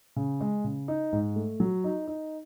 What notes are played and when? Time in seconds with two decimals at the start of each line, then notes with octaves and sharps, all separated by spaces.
0.16 C#3
0.41 G#3
0.64 C#3
0.88 D#4
1.12 G#2
1.36 A3
1.60 F#3
1.84 D#4
2.07 D#4